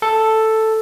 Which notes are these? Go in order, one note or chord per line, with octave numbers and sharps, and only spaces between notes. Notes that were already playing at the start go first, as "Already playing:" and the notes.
A4